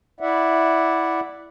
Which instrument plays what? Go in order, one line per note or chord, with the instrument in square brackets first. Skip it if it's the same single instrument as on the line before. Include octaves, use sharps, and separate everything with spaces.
[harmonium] E4 D5 E5 F#5